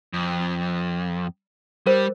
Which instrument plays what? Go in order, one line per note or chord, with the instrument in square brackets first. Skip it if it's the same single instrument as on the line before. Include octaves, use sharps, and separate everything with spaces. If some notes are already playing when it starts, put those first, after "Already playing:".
[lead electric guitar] F2
[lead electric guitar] G3 [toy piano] A#4 C5